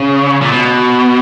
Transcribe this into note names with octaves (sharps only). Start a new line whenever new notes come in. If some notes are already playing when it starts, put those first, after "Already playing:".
Already playing: C#3
A#2
B2